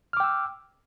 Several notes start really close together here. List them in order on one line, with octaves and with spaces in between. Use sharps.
F6 D6 G5 E6